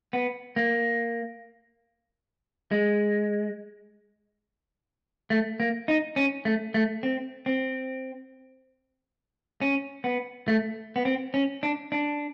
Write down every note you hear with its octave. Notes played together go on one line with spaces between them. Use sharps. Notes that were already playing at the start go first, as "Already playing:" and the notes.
B3
A#3
G#3
A3
A#3
D#4
C#4
A3
A3
C4
C4
C#4
B3
A3
B3
C4
C#4
D4
D4